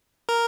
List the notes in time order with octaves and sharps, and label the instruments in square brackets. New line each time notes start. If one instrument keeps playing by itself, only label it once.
[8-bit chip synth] A#4